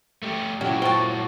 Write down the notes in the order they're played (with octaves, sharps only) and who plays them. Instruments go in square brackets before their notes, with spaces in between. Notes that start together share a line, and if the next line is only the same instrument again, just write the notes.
[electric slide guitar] A3 G4
[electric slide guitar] A#2 E4 [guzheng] F#3 [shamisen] C#4 G4
[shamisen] F4 C5 G5 [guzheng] F#4 A5